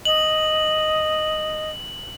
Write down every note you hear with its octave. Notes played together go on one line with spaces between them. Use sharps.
D#5 F#7